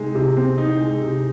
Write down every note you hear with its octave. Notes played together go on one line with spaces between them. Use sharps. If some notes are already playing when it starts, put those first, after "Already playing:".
Already playing: C3 G#3 D#4
C3
C4
D#4
G#3
C3